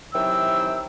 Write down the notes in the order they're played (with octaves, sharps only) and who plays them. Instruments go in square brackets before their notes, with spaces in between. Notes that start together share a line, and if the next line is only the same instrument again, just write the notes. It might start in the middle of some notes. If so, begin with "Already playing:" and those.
[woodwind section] C3 D#3 E3 F#3 G5 E6